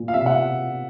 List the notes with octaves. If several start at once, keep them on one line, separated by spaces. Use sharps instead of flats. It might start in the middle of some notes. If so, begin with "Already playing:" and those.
Already playing: A#2
F5
C3 E5
F#5